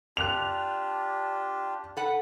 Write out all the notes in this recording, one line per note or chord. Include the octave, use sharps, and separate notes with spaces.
D4 F4 G4 F#6 F7
A4 B4 F#5